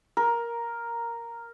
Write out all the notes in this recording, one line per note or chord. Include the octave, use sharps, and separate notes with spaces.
A#4